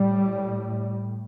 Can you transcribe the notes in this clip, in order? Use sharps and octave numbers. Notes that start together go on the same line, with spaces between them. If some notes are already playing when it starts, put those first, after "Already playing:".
Already playing: A2 G3